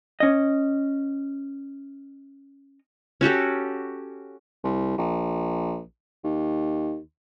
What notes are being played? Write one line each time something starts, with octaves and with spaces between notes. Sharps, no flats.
C#4 D#5
C#4 F#4 G4 A4
C2
A#1
D#2